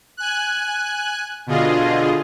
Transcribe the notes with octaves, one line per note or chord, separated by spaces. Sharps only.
G#5 F#6
B2 D3 F4 G#4 D#5